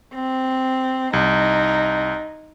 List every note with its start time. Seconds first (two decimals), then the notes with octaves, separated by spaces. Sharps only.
0.15 C4
1.13 C2 D#4